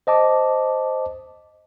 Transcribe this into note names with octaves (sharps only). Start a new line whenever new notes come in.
C5 D#5 A5 D6